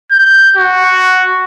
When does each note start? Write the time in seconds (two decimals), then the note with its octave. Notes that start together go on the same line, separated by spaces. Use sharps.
0.12 G6
0.57 F#4